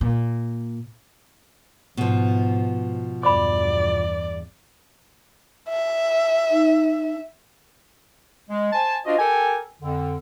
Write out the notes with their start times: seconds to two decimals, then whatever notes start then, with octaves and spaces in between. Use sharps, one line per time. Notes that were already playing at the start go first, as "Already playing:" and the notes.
0.01 A#2
1.97 G#2 B2 F3
3.23 E2 G2 D5 B5 D6
5.69 E5
6.51 D#4
8.50 G#3
8.73 C5 G#5 A5
9.06 D4 F4 F#4 C5 D#5
9.19 G4 A4 A#4 G5 G#5
9.82 F2 D3